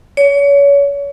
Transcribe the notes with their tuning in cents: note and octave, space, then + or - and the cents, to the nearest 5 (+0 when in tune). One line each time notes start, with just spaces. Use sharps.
C#5 +30